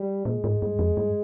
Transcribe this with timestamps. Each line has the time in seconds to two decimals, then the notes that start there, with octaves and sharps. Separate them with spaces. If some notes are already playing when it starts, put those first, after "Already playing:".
Already playing: G3
0.25 A#2 G#3
0.44 G#2
0.62 G2
0.79 F2
0.97 G2